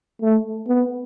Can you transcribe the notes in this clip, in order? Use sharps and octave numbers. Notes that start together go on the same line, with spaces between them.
A3
B3